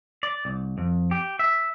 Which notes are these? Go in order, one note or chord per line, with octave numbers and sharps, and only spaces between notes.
D5
C2
F2
G4
E5